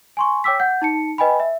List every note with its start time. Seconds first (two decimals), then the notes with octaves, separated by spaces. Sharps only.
0.17 G#5 C6 C#6
0.44 C#5 G5 D6 E6 B6
0.60 F#5 G6
0.82 D#4 A5 C#7
1.18 B4 D#5 G5 G#5 B5
1.40 E5